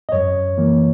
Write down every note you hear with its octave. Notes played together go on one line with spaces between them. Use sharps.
D#5
F#2 C#5
E3 A#3